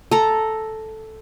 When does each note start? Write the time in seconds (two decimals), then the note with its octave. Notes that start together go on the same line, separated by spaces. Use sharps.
0.11 A4 A#5